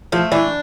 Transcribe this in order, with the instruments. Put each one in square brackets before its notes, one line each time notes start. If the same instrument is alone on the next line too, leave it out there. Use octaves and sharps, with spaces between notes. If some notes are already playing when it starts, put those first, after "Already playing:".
[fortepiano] F3 [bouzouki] A3
[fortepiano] E3 [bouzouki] D4